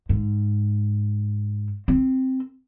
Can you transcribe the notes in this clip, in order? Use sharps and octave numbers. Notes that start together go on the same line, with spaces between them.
G#2
C4